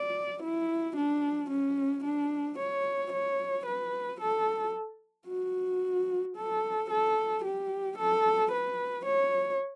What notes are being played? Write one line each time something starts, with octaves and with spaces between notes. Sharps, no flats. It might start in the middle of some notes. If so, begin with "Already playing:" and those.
Already playing: D5
E4
D4
C#4
D4
C#5
C#5
B4
A4
F#4
A4
A4
G4
A4
B4
C#5